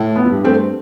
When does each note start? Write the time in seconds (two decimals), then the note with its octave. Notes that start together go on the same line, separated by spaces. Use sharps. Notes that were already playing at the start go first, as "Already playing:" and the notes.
Already playing: A2
0.16 B3
0.23 F2
0.30 G2
0.44 A3 C4